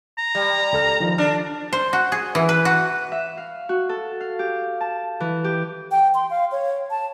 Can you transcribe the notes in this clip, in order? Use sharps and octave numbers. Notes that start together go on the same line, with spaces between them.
A#5
G3
C#2 A4 F6
D#3 F3
D4 F6
C5
F#4
G#4
E3
B4
F#4
E5
F5
F#4
A4
F5
G4
A5
E3
G4
G5
C6
F5
C#5
A5